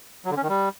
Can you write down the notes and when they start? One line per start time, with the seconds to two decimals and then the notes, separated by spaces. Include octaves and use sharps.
0.25 F#3
0.31 D3
0.37 C#4
0.43 D#3
0.49 G3